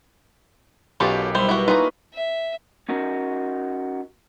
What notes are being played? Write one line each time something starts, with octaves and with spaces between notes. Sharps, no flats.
B1 B2 D#3 C#4 F4 G4 A4
G3 E4 C5 B5
B2 E4 F#4
A#3 D#4 F4 G#4 B4 C#5 A5 A#5
E5
C#4 D#4 F#4 A#4